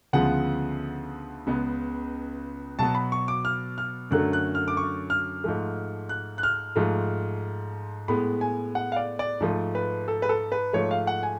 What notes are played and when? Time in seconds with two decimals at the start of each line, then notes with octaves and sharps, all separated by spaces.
0.13 D2 C#3 F3 G#3 B3 F#5
1.47 C#2 C#3 G#3 B3
2.79 B2 F#3 B3 A5
2.95 B5
3.12 C#6
3.28 D6
3.45 F6
3.78 F6
4.11 F#2 D3 F#3 A3 F#6
4.33 F#6
4.55 F6
4.68 D6
4.77 C#6
5.10 F6
5.44 G#2 F3 A3
6.09 F#6
6.38 F#6
6.43 F6
6.76 G#2 F3 A3
8.08 A2 G#3 B3 B5
8.41 G#5
8.75 F#5
8.92 F5
8.96 D5
9.19 D5
9.41 G#2 F3 A3
9.75 B4
10.08 A4
10.22 B4
10.29 A4
10.52 B4
10.73 G#2 F3 A3 C#5
10.91 F5
11.07 F#5
11.23 G#5